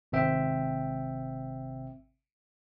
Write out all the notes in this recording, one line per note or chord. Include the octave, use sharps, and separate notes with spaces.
G#1 C3 C4 E5 G5